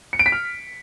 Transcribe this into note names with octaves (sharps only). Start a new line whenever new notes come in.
C#7
D7
B6
F6